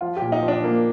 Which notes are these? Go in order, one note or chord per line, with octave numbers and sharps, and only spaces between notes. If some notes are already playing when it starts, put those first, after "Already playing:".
F3 F4
G4
A#2
D#4
F3
D4
A#2 A#3